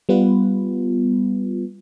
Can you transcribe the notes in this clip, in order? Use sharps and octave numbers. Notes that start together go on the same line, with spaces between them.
G3 B3 F4 B4